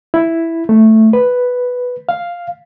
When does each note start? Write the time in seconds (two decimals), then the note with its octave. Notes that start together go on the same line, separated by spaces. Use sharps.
0.14 E4
0.69 A3
1.13 B4
2.09 F5